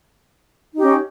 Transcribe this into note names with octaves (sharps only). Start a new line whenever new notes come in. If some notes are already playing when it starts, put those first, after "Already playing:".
C#4 D#4 G4